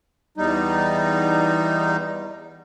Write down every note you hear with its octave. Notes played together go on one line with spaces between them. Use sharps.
E2 G3 D#4